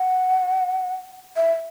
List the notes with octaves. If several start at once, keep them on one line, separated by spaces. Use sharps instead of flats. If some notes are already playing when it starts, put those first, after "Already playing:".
Already playing: F#5
E5